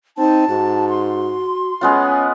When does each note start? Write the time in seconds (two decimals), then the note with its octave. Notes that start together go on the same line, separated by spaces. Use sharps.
0.18 C4 D#4 A5
0.49 G#2 F#4
0.89 C6
1.81 G#3 B3 C#4 F4